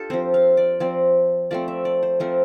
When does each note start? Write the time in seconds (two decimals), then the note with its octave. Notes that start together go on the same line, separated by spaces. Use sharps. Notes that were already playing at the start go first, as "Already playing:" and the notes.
Already playing: D4 F4 G4 A4
0.10 F3 C4 C5
0.34 F5
0.57 D5
0.80 F3 C4 D5
1.51 F3 A3 C4 D5
1.68 E5
1.85 D5
2.03 C5
2.20 F3 A3 C4 A#4